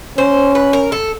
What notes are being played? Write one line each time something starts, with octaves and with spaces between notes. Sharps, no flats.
C#4 C5
B4
A#4
A4